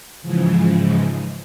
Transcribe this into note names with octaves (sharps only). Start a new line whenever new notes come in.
G#2 C#3 E3 F3 G#3